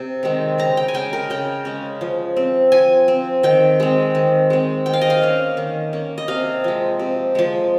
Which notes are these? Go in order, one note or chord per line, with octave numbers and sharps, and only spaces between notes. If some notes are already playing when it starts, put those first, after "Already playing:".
Already playing: C3
D#3 G#3 C4
C#3 A#5
G5
G#5
G#3 C#4 G5
A#4
C#3 G5
G#3 C#4
F3
C4
F3 G#5
C4
D#3 G5
G#3 C4
D#3
G#3 C4
D#3 G5
F5
D#5
F5
A#3 C#4
D#3
A#3 C#4
D#5
C3 F5
F3 G#3
C3
F3 G#3